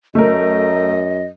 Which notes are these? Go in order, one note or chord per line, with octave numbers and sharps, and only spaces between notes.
F#2 A3 A#4 D#5